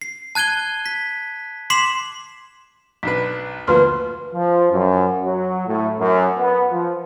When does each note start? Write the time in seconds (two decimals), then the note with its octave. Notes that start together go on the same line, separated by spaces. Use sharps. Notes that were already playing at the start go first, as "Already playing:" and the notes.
0.02 C7
0.35 A5 F#6 G#6 D#7 G7
0.86 B6
1.70 C6 D6 B6 C7 E7 F#7
3.03 B1 D4 B4 B6
3.67 D2 F3 A#3 B4 C6 F6
4.33 F3
4.70 F#2
5.23 F#3
5.67 A2
5.98 F#2
6.37 B3
6.69 F3